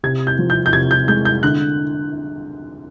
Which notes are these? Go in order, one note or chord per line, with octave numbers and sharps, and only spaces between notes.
C3 G#6
G6
F3
G6
G6
C3 G#6
G6
G#3 G6
G6
D3 F#6